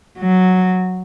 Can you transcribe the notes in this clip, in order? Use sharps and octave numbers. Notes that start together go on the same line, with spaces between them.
F#3